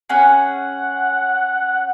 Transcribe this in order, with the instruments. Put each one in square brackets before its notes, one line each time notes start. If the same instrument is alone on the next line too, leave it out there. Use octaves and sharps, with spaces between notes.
[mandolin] C#4 G#4 [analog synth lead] F#5